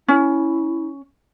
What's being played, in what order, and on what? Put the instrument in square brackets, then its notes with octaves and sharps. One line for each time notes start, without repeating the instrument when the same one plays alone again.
[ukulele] C#4 [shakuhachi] E4